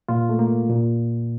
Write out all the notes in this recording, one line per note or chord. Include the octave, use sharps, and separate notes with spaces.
A#2 F4
A3
A#3
A#2